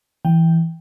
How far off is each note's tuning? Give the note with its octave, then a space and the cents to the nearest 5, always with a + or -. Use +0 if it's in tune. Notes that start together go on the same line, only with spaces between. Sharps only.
E3 +0 G5 +0